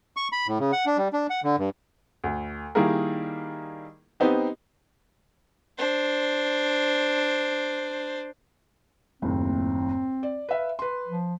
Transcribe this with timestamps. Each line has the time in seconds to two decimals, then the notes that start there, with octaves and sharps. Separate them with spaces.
0.17 C#6
0.32 B5
0.48 A2
0.60 C#3
0.72 F#5
0.86 D4
0.98 G3
1.13 D4
1.30 F#5
1.44 D3
1.58 G2
2.24 D2
2.75 D#3 G3 A#3 E4 G#4 A#4
4.20 B3 C4 D#4 G4
5.78 D4 C5
9.22 F#1 D#2 A2 C4
10.23 D5
10.49 B4 E5 F5
10.79 B4 C6
11.07 F3